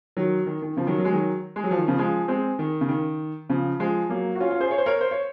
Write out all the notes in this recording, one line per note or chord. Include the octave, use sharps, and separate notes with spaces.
D#3 F#3
D#3
D#3
C#3 F3
D#3 F#3
F#3
G#3
D#3 F#3
G#3
F#3
F3
D#3
C#3 F3
F3 G#3
G#3 C4
D#3
C#3
D#3
C#3 F3
F3 G#3
F#3 A#3
F#4
C#4 F4
C#4 F4
G#4 C5
C#5
C5
A#4 C#5
C5
C#5